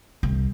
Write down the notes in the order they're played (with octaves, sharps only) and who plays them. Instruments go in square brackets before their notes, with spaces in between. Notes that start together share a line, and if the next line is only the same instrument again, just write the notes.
[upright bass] C2